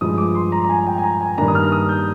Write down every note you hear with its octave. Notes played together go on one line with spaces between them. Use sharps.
G2 F3 G#3 D#6
D6
C6
A#5
A#5
G#5
G5
G#5
A#5
G#5
G2 D#3 G3 A#3 D4 A#5
D#6
F6
D#6
G6